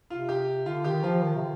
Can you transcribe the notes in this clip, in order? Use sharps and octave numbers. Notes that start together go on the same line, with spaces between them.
C3 F4
G4
D3 F4
D#3 G4
F3 F4
D#3
C3
D3